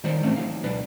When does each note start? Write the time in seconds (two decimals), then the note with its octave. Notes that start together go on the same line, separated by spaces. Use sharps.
0.04 D#3 G3 D#4 C5 D5
0.23 E3 A3 C4 C#4
0.36 F#3 D#4 F5
0.63 C#2 B2 D4 B4